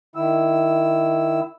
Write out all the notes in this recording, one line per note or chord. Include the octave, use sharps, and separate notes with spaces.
D#3 E4 E6